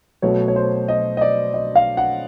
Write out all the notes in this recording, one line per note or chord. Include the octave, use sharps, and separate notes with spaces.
B2 F#3 A3 C#5
C#5
C5
D#5
D#5
D5
D#5
F5
F#5